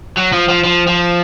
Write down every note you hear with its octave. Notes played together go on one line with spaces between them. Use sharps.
F#3
F3
F3
F3
F3